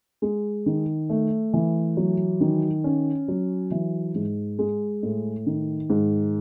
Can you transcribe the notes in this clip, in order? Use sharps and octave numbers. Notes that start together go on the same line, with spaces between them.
G#3
D#3
A3
E3
F#3
D#3
C#4
F#3
E3
G#2
G#3
A2
D#3
G#2